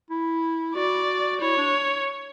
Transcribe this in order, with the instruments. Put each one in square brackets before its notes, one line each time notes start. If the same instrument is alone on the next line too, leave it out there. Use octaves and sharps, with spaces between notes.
[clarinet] E4
[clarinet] F#4 [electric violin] D5
[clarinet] E4 [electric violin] C#5
[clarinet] D4